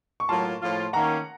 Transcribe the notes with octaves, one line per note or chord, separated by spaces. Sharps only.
C#6
A2 F#3 A#3 F4 A5 C6
A2 F3 A#3 F4
D#3 A#3 C#4 F#5 A#5